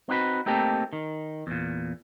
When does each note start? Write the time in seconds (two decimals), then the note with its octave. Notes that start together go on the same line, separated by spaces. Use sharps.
0.09 C4 D#4 F#4 B4
0.46 A3 A#3 C4 D#4 G4 A4
0.93 D#3
1.47 E2 A#2